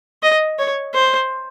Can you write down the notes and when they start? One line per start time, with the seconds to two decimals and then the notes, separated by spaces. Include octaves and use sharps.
0.23 D#5
0.59 C#5
0.94 C5